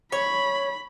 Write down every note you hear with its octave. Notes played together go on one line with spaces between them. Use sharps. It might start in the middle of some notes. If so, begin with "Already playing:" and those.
C#5 B5